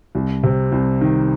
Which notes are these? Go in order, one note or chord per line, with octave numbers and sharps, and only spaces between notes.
C2
C3
C2
D#3